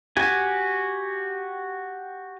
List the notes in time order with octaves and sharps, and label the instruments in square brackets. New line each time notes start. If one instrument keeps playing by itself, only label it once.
[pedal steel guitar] F#4 G4 G#5